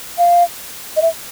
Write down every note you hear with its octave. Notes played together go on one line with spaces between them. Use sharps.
F5
D#5
E5